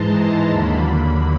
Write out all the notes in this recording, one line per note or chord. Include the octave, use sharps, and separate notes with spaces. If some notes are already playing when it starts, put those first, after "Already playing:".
Already playing: G#2 E3 G#3 A5 A#5 C6
D#2 D3 F#3 A#3 B5